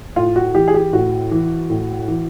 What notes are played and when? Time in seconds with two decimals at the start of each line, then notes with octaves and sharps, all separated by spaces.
0.16 A2 F4
0.36 F#4
0.55 E3 G4
0.68 G#4
0.74 G4
0.93 A2 F#4
1.31 E3
1.70 A2
2.08 E3